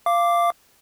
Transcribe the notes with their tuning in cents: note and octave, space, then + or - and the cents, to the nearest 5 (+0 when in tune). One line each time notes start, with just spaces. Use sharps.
F5 -15 D6 +0